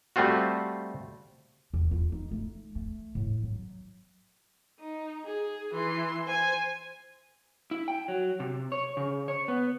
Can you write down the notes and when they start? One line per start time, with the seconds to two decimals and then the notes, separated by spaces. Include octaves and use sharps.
0.16 G3 A3 C4 F4 F#4
1.74 E2
1.91 F4
2.12 D#4
2.31 A3
2.75 A3
3.15 A2
3.43 F#3
4.79 D#4
5.25 G#4
5.75 E3 C6
6.26 C5 G#5
7.71 E4
7.88 G5
8.08 F#3
8.40 C3
8.72 C#5
8.97 C#3
9.28 C#5
9.48 B3